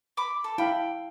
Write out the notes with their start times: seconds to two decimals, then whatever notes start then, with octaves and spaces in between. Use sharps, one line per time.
0.17 B5 D6
0.44 A4
0.58 E4 F5 G5 B5